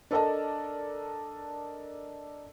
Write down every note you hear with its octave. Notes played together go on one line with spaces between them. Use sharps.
D4 A4 A#4 D5 D#5 A5